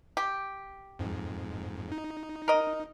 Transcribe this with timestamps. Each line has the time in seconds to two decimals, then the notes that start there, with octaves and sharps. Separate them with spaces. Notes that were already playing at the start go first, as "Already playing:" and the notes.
0.17 G4
0.99 F2 G#2
1.92 D#4
2.48 A#4 D#5